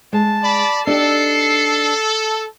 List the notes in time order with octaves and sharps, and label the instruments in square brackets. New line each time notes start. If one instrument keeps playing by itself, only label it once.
[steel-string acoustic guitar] G#3 [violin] A5
[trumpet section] D5 B5
[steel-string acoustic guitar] D4 D#4 G4 [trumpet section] A4 [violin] C7 C#7